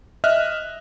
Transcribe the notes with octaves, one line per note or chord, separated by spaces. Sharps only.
D#5 E5 F6 F#6